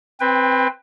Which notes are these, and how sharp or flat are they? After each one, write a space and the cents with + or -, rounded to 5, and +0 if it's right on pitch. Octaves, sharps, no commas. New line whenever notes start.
C4 +0 B4 +0 G5 +30